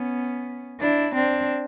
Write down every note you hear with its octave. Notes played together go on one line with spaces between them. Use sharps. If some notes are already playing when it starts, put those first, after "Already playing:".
Already playing: B3 C#4
D4 E4
C4 D4